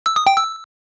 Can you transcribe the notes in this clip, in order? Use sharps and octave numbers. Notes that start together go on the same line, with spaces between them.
E6
D#6
G5
E6